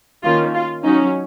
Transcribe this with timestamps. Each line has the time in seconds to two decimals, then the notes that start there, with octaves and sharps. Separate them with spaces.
0.24 D#3 A#3 C#4 F4
0.54 F4
0.84 F#3 C#4 D#4